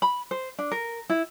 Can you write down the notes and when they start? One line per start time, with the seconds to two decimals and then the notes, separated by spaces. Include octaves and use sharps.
0.02 B5
0.31 C5
0.59 D4
0.72 A#4
1.10 E4